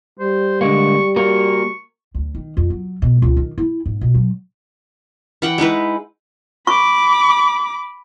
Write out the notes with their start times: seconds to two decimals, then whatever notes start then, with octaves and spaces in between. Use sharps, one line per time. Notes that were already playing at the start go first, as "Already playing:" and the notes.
0.19 G3 C5
0.61 D3 G#3 A#3 C#6
1.16 A#3 F#4 A#4 C#6
2.15 D2
2.35 D#3
2.57 F2
2.70 F#3
3.02 B2
3.22 C#2
3.37 D#3
3.58 E4
3.86 G#2
4.01 B2
4.14 F#3
5.42 E3 F#5 G5
5.58 G#3 D#4 E4 B4
6.67 B5 C#6 D6